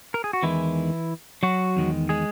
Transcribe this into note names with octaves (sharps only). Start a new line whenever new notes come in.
A#4
G#4
F#4
E2 D#3 E3 G#3 E4
F#3 F#4
E2 D#3 G#3
G#3 G#4